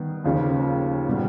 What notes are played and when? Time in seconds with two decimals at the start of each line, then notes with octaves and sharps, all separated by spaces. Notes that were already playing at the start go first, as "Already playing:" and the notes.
Already playing: D#3 G3 B3
0.24 D#2 C#3 F3
1.08 A#2 G3 B3